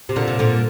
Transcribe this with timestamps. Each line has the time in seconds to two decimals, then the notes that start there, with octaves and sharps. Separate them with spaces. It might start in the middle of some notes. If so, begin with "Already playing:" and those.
0.09 C3
0.16 A#2 D3
0.28 C3
0.39 A#2 D3